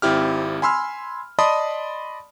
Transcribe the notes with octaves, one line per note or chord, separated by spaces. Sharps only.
G#1 C4 E4 G4 F6
G#5 B5 C6 E6 F6
D5 D#5 A5 B5 C6 D#6